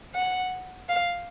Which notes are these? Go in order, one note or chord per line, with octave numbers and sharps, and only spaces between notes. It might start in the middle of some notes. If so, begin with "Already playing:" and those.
F#5
F5